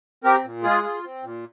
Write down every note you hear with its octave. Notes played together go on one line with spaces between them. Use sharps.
C4 G4 A#4
A#2
G#3 F4 G#4
F4
C4
A#2